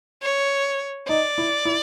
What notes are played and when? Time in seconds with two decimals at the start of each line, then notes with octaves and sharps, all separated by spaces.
0.22 C#5
1.08 D#4 D5
1.38 E4
1.65 E4